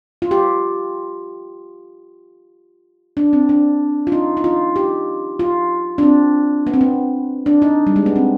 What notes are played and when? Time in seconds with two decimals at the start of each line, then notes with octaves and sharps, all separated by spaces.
0.22 F4
0.31 G4
3.17 D4
3.33 C4
3.49 D4
4.07 F4
4.12 D#4
4.37 D#4
4.44 F4
4.76 G4
5.39 F4
5.98 D4
6.03 C4
6.67 B3
6.74 C4
6.81 B3
7.46 D4
7.62 D#4
7.87 G3
7.96 G#3
8.06 B3
8.16 C4